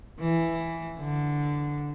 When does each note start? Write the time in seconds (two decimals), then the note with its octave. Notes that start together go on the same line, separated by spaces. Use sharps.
0.19 E3
1.00 D3